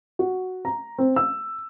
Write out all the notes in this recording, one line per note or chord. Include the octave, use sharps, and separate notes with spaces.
F#4
A#5
C4
E6